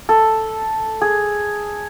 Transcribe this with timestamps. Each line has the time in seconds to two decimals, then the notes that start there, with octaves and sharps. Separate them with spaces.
0.09 A4
1.01 G#4